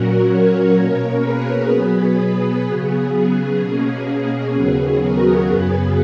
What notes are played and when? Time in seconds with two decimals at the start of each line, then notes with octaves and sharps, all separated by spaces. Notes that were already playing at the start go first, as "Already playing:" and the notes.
Already playing: A#2 F#3 C#4 F#4 A#4
0.28 A#4 C#5
0.75 B2 A#3 C#4 A#4 C#5
1.23 G#4 B4
1.70 B2 F#3 B3
2.17 G#4
2.65 C#3 F#3 B3
3.12 G#4
3.59 B2 A#3 C#4 G#4
4.54 D#2 C#3 F#3 B3 G#4
5.01 F#4 A#4
5.48 F#2 C#3 F#3 B3 G#4 B4